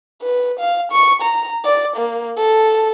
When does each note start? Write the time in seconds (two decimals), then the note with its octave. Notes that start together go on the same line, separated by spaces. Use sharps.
0.22 B4
0.59 F5
0.92 C#6
1.22 A#5
1.65 D5
1.97 A#3
2.37 A4